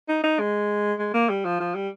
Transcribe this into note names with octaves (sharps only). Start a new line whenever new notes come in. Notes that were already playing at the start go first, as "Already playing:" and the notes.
D#4
D#4
G#3
G#3
A#3
G3
F3
F3
G3